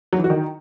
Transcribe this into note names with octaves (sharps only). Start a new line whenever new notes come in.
F#3
E3
F#4
D#3